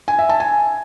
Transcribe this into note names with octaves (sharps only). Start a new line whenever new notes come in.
G#5
E5
A5
G#5